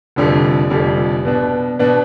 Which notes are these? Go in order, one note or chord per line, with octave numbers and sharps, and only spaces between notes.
F1 F2 D3 G3 D4
F1 F2 D3 G3 D4
B2 B3 D4
B2 B3 D4